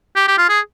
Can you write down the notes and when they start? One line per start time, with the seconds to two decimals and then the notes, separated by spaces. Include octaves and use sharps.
0.16 G4
0.27 G4
0.38 F4
0.49 G#4